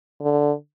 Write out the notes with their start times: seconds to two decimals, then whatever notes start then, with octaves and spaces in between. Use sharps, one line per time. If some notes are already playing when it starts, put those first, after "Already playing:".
0.21 D3